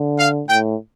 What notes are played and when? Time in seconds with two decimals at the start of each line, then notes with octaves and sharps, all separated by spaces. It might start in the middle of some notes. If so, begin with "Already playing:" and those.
Already playing: D3
0.18 F5
0.48 A2 G5